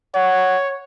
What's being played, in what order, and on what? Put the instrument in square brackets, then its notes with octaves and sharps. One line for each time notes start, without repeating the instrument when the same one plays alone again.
[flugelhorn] C#5 [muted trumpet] F#5